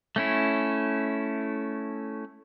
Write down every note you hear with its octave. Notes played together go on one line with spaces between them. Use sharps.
A3 C#4 E4